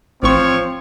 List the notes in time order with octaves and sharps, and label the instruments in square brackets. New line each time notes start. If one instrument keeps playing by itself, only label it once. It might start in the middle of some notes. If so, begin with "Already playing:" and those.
[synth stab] A1 C#6 [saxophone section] F3 [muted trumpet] C4 [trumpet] C#5